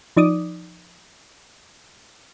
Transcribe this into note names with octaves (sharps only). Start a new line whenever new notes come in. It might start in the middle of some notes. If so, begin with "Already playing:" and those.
F3 D#4 D5 D6 D#6